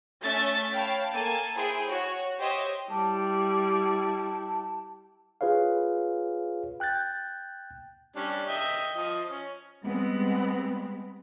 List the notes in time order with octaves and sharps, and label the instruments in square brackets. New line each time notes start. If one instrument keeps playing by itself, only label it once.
[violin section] A3 C#4 E5 A6
C#5 F5 G5 A5 B5
A#3 A4 G#5 A5
E4 G#4 C5 G5
F#4 C#5
G4 C5 C#5 D#5 E5
[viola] G3 E4 [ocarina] A5
[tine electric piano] F4 G#4 B4 C#5 F5
G5 F#6 G6 A6
[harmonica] G3 C#4 D4
D#5 E5 G5
F3 D#5
C#4
[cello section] G3 G#3 B3 C4